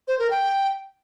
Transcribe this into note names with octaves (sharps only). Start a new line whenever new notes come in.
C5
A#4
G5